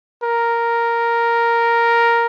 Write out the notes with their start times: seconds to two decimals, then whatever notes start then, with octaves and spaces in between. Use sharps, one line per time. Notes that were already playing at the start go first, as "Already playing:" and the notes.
0.24 A#4